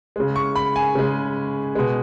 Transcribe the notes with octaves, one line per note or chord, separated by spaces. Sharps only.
C#3 G#3
C#6
B5
G#5
C#3 G#3
B2 G#3